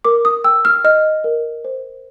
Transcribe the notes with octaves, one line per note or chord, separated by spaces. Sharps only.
A#4 D6
D#6
G5 E6
F6
D#5 F6
A#4
C5